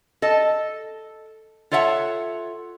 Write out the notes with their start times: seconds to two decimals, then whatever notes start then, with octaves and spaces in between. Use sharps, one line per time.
0.22 A4 D#5
1.71 F4 A4 C#5 E5 F#5